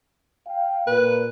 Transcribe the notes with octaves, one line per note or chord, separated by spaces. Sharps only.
F5 G5
A#2 B4